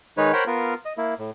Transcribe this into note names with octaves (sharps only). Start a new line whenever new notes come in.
D#3 G#3 D#4 B4 C#5
A#4 C5 C#5 F#5 G5 B5
B3 F4 A#4
D#5
A#3 E4
A2